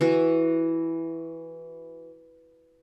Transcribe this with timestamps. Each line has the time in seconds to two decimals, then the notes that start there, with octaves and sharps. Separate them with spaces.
0.01 E3 F#4